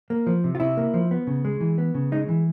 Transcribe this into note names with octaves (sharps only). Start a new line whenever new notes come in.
A#3
F3
C3
F4
C3 E4
A#3
F3
B3
C#3
G#3
E3
B3
C#3
G#3 D#4
E3